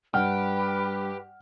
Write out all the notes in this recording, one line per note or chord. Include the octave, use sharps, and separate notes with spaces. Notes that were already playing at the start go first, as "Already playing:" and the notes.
G2 G4 B4 F#5 F6